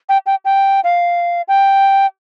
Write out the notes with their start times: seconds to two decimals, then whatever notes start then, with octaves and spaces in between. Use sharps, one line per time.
0.09 G5
0.26 G5
0.45 G5
0.84 F5
1.48 G5